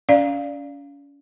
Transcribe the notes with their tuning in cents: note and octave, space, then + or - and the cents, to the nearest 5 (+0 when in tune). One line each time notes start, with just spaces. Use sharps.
C#4 +35 D5 +0 F5 +0